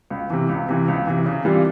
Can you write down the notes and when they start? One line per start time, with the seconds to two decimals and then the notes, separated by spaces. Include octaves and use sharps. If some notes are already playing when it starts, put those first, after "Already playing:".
0.10 C#2
0.30 C3 E3
0.49 C#2
0.69 C3 E3
0.88 C#2
1.07 C3 E3
1.26 C#3
1.45 E3 G3 C4 F4